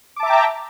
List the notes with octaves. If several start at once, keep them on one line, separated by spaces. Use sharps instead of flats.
E5 G5 A5 A#5 D6